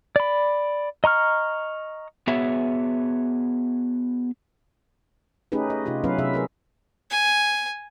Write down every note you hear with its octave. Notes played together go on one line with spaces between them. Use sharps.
D5 B5
D#5 A#5 C#6 F6
B3 F#4 G#4 C#5 E5
A3 C#4 D#4 G4 G#4 B4
D#5
C3 D#4 F4 G4
F#3 B3 C#4 E4 B4 F5
C3 C#4 G#4 E5
G#4 A#4 B4
G#5